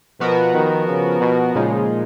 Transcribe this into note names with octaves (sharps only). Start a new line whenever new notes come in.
B2 F3 B3 F#4 A#4
D#3
C#3
B2
A#2 C#3 F3 G#3 D#4